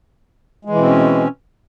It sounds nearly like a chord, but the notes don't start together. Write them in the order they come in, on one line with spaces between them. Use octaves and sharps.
G#3 E3 B2 C4 C#4